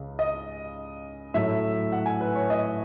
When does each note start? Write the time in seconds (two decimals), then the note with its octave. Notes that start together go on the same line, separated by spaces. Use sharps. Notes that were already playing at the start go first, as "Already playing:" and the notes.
Already playing: C#2 C#3 G#3
0.19 D#5
1.34 A2 F#3 A3 E5
1.92 F#5
2.06 G#5
2.21 B4
2.35 C#5
2.50 D#5